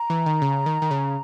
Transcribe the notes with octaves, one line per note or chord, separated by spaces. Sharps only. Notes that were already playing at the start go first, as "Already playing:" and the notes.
Already playing: A#5
E3
D#3
C#3
D#3
D#3
C#3